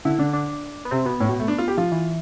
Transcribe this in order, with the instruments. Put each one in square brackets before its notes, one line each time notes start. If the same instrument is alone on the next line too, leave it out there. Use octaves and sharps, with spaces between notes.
[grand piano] D3 [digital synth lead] E4
[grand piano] D3 [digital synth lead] D4
[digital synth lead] D4
B3
[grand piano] C3 [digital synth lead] C4
[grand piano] B2 [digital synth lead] B3
[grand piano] A2
B2
A3
D4
F4
G4
[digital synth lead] F3 [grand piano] F4
[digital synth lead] E3